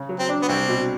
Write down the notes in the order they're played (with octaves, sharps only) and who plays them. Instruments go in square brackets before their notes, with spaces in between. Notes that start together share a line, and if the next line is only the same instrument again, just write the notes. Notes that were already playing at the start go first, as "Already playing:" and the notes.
Already playing: [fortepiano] C#3
F#3
[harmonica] C4
[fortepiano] D4
[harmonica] B3
[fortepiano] C2 [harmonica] C4
[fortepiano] B2